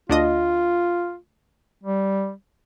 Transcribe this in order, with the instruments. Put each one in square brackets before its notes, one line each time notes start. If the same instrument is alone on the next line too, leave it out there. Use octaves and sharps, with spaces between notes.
[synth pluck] D2 D4 D#5 [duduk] F4
[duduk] G3